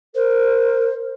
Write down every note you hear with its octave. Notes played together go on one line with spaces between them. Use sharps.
A#4 C5